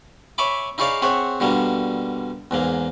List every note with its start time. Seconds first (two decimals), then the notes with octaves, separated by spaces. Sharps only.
0.38 C#5 E5 G#5 B5 D6
0.78 D#4 E4 G#4 C#5 D5 F5
1.02 C4 G#4 C#5 E5 F#5
1.40 B2 D3 G3 A#3
2.51 E2 G#2 A#3